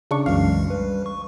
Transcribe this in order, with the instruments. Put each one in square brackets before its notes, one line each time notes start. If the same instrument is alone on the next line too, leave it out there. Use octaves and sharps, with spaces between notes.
[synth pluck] C#3 D4 C#6
[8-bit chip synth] C2 E3 G#3 [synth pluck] F#2 F5
[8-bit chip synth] G3 B4
C#6